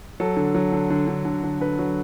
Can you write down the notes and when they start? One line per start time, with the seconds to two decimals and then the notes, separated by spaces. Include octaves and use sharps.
0.20 F#3 A4
0.37 D3
0.55 F#3
0.72 D3
0.90 D3
1.07 D3
1.25 D3
1.43 D3
1.60 D3 B4
1.79 F#3